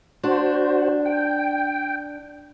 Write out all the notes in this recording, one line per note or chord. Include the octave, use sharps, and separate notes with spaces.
D4 F#4 C5
G5